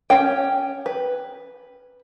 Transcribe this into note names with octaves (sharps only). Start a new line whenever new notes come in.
C#4 G5
B4